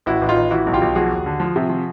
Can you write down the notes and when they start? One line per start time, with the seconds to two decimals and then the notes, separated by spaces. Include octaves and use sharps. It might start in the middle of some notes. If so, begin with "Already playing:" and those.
0.06 A1 E4 F#4
0.22 A1
0.29 D#4 F4
0.36 A1
0.51 E3 E4 F#4
0.66 B1
0.73 F4 G4
0.81 B1
0.95 F3 F#4 G#4
1.11 D#2
1.26 D3
1.40 F3
1.56 C3
1.69 F3